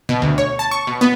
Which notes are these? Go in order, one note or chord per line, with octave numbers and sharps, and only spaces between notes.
B2
D2
C#5
A5
C#6
B2
B3